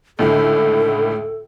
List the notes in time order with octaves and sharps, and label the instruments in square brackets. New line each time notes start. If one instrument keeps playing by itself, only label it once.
[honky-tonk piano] C#2 A2 D3 [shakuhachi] A4